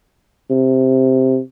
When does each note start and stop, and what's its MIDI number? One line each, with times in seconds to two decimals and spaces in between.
0.50 1.39 48